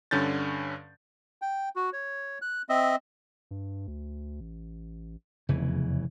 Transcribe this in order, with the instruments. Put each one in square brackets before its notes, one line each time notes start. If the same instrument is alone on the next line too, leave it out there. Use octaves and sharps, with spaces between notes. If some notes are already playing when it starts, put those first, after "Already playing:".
[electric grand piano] G2 D3 C#4 G6 A6
[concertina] G5
F#4
C#5
F#6
C4 D#5 E5
[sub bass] G2
D2
A1
[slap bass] F1 C#3 E3 [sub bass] E2